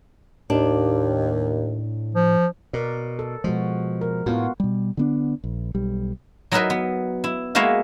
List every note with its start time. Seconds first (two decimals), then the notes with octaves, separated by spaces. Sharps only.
0.50 D#2 A2 D4
2.15 F3
2.73 B2 A#4 D5
3.19 A4
3.44 B2 F3 G#3 F#4
4.01 A#4
4.26 A2 B3 F4 F#4
4.60 B2 G3
4.97 D3 B3 D4
5.44 A#1
5.75 B1 G3
6.52 F#3 D#4 E4 A#4 B4 D#5
6.70 B3
7.24 E4
7.55 G#3 A#3 B3 E4 F#4 F5